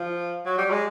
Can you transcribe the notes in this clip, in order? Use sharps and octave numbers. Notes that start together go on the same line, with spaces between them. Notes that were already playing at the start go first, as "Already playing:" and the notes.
Already playing: F3
F#3
G3
G#3